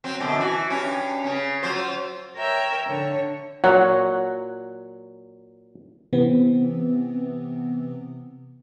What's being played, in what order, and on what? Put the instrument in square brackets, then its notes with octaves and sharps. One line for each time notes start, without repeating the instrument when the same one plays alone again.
[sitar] F#3 C4
F#2 B2 D3
E3 F#4
G2 C#4
C#3 C#4
F#3 F4 C5
[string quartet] A#4 C#5 E5 G5
D3 C#5
[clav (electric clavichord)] A#2 F#3 [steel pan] C#5 F#5
[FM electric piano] C3 E3 B3 C4